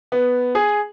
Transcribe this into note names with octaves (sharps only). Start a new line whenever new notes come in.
B3
G#4